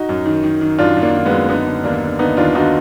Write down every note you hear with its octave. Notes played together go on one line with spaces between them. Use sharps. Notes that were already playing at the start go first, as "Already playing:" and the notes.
Already playing: D#4 F#4
F#2
D#3
D#3
D#3
F#2 D4 F4
F#2
A#3 D4
D#3
G#3 B3
F#2
D3 B3 D#4
D3
D#2 A#3 D4
D3
D3 B3 D#4
D#2 D4 F4
D3 D#4 F#4